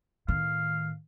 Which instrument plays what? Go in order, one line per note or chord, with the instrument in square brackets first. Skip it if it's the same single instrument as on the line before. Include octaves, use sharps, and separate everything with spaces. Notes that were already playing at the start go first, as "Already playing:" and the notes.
[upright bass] A2 D#3 [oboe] F5